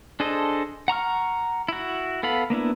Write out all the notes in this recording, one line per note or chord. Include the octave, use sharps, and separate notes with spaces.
D4 G#4 A4 C5 D#5
F#5 A#5 C#6 F6
E4 F#4
B3 A4 F5 B5
A#3 B3 D4 E4